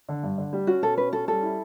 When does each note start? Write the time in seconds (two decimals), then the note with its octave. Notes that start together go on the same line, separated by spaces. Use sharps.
0.09 D3
0.23 G2
0.38 D3
0.53 G3
0.67 C#4 F#4
0.83 B2 A4
0.98 C#4 B4
1.13 C#4 A4
1.28 G3 A4
1.43 E4